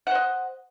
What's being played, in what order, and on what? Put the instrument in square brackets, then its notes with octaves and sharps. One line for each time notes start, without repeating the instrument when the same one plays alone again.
[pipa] F#5
C5
D#5